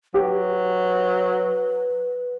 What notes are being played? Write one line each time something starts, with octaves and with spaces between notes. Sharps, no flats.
F#3 G4 B4